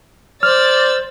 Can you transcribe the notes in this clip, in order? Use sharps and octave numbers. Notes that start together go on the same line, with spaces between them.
C5 D5 E6 F6 A6